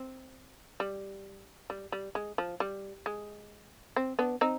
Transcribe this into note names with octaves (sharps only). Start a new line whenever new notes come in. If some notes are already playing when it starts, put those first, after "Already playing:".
Already playing: C4
G3
G3
G3
G#3
F3
G3
G#3
C4
B3 D4
C4 D#4